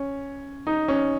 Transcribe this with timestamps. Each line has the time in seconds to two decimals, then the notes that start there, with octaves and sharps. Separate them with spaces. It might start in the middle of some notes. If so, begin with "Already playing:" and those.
Already playing: C#4
0.67 D#4
0.88 C#4